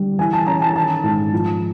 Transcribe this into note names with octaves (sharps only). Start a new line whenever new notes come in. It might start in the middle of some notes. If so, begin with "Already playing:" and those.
Already playing: D3 G3
E3 G#5
A5
C#4 A#5
A5
D#3 A5
G#2
F3